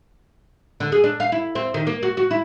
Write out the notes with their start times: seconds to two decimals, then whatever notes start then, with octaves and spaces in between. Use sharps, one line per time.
0.80 D3
0.92 G#4
1.04 D4
1.20 F5
1.32 E4
1.55 C4
1.74 D#3
1.87 A#3
2.03 F#4
2.17 F#4
2.31 E4